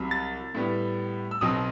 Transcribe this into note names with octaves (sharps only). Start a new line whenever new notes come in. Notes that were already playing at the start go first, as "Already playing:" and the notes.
Already playing: C2 C3 F#3
A6
A2 G3 B3
E6
B1 B2 F#3 C4 D#4 D#6